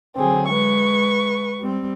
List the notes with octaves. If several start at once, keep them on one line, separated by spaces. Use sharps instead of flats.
D3 F#3 C4 G#4
G#3 B4 C#6
G3 C4